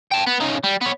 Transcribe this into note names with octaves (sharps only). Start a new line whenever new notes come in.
G5 A5
B3
C#3 D#4
G3
B3 C#5